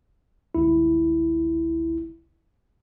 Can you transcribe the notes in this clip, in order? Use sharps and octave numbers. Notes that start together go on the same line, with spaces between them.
G1 C#2 E4